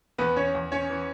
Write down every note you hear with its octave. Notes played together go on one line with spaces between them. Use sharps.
E2 B3 B4
C#4 C#5
E2
C#4 C#5
E3